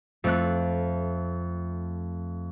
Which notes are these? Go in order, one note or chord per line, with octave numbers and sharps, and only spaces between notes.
F2 A3 F#6